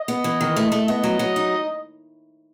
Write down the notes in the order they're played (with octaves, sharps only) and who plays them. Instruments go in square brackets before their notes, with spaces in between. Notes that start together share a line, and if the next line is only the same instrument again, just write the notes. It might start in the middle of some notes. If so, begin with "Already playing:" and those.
Already playing: [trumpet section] D#5
[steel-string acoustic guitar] B3
E3
D#3
A3
A3
[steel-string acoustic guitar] B3 [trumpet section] D#5
[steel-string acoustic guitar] F#3
F#3
D#4